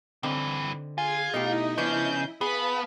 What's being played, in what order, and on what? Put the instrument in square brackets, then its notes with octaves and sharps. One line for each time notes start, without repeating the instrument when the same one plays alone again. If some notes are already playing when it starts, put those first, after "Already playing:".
[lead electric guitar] G2 E3 [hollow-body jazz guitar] D3 C4 D#4
[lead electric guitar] F4 [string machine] G#4 [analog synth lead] G#5
[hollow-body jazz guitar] B2 A3 G4 [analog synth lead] D#4 [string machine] E4 D#5 E5
[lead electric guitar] C#3 [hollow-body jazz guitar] F3 B3 D4 [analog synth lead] G6
[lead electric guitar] B3 [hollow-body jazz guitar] G#4 [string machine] B4 F5 A5 [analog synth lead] B5